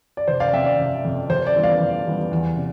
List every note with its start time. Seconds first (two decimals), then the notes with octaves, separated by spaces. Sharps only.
0.17 D5
0.28 F1 C5
0.40 D5 F5
0.53 F2 C3 E5 G5
0.66 D5
0.79 F1
1.05 F2 C3
1.29 F2 C5
1.47 D5
1.55 E3 G3 B3
1.63 D5 F5
1.80 F2
2.06 E3 G3 B3
2.31 E2
2.56 C3